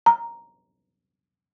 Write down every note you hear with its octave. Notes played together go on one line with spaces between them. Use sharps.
A#5